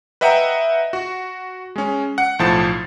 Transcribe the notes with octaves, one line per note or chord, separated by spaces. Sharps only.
B4 D#5 E5 F#5 G5 A#5
F#4
G#3 C#4
F#5
B1 A2 F3 C5 A5 A6